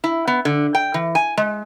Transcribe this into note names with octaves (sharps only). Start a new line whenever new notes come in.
E4
B3
D3
G5
E3
G#5
G#3